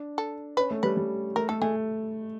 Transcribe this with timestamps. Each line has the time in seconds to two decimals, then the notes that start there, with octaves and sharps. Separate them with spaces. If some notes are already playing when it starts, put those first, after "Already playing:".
Already playing: D4
0.18 A4
0.57 C#4 B4
0.71 A3
0.83 G3 B4
0.97 G3
1.36 A3 A#4
1.49 A3 A4
1.62 A3 G#4